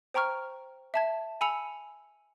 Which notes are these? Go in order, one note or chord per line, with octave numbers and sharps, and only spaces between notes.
C5 G5 A#5 C#6 F6
E5 A5 G#6
G#5 B5 E6 C#7 F7